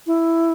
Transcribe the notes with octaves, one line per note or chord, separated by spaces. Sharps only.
E4